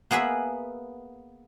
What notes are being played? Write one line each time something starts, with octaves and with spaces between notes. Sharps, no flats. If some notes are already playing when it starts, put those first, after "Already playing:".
A#3 B3 G#4 B4 E5